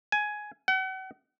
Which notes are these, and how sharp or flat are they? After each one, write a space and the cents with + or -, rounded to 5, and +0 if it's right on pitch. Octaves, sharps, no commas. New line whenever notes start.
G#5 +10
F#5 +40